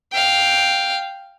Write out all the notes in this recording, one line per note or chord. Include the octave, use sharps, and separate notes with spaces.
F5 G5